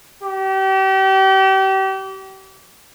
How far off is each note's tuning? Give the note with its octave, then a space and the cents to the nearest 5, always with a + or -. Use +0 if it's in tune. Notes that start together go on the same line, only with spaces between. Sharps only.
G4 -35